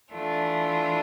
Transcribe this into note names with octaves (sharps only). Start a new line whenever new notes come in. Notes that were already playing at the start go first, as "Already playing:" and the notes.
E3 A3 D4 F4